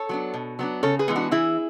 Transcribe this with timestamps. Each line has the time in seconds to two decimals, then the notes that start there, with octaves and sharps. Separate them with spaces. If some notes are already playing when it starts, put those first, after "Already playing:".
Already playing: A4 C#5
0.09 F#3 B3 D4
0.34 B2
0.59 F#3 B3 D4
0.83 C#3 A4 C#5
0.99 G#4 B4
1.08 E3 G#3 B3
1.16 D4 F#4
1.31 E3 E4 G#4